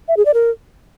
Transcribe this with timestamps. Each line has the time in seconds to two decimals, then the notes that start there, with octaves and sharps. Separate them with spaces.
0.08 E5
0.17 G#4
0.25 D5
0.34 A#4